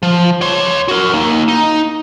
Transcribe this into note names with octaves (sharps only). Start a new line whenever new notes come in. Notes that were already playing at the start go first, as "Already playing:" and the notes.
F3
C#5 C6
F#4 A#4
A#3 D#4
D#4